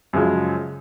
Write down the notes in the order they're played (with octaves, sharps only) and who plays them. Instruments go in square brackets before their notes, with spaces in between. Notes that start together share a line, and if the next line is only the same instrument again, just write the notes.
[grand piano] F#2 C#3 F3 G#3